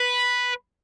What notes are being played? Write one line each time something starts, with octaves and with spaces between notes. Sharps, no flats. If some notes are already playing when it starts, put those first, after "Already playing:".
Already playing: B4